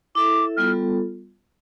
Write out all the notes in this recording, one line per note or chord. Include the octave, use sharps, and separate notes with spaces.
E4 A4 E5 D6
G3 B3 F4 A4 F6